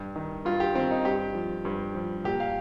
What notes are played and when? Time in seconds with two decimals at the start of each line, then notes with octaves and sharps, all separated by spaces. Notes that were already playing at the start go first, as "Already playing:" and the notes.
Already playing: G2
0.16 D#3
0.45 G2 F4
0.60 G4
0.75 D#3 C4
0.91 D#4
1.05 G2 G4
1.35 F3
1.65 G2
1.94 F3
2.24 A#2 G4
2.40 F5